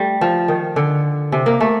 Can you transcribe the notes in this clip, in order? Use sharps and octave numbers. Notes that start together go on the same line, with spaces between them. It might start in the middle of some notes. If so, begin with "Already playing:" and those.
Already playing: G3 A3
F3
D#3
D3
C3
A#3
A3